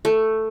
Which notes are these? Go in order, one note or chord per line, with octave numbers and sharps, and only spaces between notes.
A3